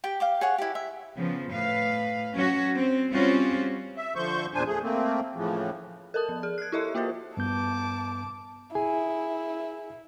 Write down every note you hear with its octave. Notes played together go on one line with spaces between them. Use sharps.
G4 G5
F5 G5 D6
G#4 C#5 F#5
E4 G4
E5
C#3 F3 B3
A2 B4 F5
F#3 C#4 F#4 C#5
C4
G3 C4 C#4 F4 F#4 C#5
E5
D3 F3 C5 C#6 G6
E2 A#2 D4 C5 G#5
A3 G#4
A3 A#3 C4
A2 C#3 E3 F3
A4 A#4 A5 D#6
F3
G#4
F#6 G#6
E4 G4 A4 D#5 E5 C6
A#3 F4 F#4 A#4 C5
G2 B3 A5 D6 G6
E4 G#4 G#5